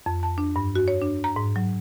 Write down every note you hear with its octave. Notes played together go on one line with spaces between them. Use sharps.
F2
A5
D4
G2
F#4
C#5
D4
A#5
G#2
F#3